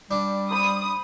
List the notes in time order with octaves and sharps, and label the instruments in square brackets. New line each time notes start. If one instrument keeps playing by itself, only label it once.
[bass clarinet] G3 [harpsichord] D4
[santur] C5 B5 [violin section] D#6